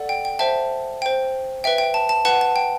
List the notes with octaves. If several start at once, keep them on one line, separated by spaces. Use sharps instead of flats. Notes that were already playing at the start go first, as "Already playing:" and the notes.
Already playing: A4 D5 F#5
G5
G5
C5 E5 G5 A5
C5 G5
B4 E5 G5
G5
A5
A5
B4 F#5 A5
A5
G5